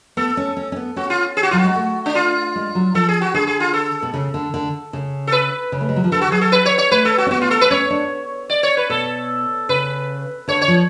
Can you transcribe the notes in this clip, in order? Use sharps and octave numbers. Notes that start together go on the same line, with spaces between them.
B3 A4
C#4
C#4
C#4
B3
C#4 F#4
F4
G#4
F#4
F#3 F4
F#4
G#3
A3
D4
F4
G#3
F#3
F3 A4
G#4
F#4
D3 G#4
G#4
F4
A4
B2
C#3
D3
D3
C#3
A4
B4
C#3
A3
G#3
F#3
F3
D3 A4
F#4
F#3 G#4
A4
B4
C#5
C#5
A3 B4
A4
F#4
C#4
B3 F#4
F4
A4
B4
C#4 C#5
D4
D5
C#5
B4
B2 A4
C#3 B4
D3 C#5
C#5
F3